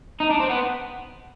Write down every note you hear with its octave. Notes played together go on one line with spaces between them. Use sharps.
D#4
D4
C4
B3